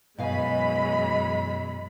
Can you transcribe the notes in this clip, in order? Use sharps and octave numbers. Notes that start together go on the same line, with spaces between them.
F#2 B2 E3 G#3 D#5 F5 G#5 B5